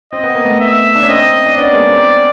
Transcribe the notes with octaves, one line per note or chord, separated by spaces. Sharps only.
C4 D#5
B3
A#3
A3 B3
E5
D4
C#4
A#3 C4 D#5
D4
B3 C#4 D5
G#3 A#3
A#3 C4